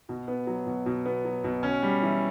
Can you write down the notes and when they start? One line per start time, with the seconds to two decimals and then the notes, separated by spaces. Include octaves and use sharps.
0.09 B2
0.28 B3
0.47 F#3
0.67 B2
0.86 B2
1.05 B3
1.25 F#3
1.44 B2
1.63 C#4
1.82 G3
2.02 E3